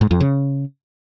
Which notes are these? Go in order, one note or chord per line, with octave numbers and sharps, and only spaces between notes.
G#2
F2
C#3